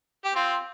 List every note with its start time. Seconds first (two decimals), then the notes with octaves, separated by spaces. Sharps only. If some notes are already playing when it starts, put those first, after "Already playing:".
0.24 G4
0.35 C4 F4